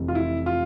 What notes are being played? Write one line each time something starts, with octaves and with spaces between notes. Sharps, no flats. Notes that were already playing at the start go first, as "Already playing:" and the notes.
Already playing: F1 F2 E3
F4
E4
F4